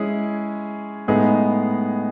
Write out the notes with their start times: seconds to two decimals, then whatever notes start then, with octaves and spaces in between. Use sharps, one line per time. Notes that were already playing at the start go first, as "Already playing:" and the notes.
Already playing: G#3 C#4 E4 G#4
1.08 A2 G#3 B3 D#4 G#4